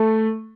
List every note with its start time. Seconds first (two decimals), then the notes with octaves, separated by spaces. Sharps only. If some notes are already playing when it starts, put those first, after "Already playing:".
Already playing: A3